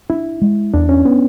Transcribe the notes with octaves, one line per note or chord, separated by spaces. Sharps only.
D4 E4
G#3
E2 D4
C#4
B3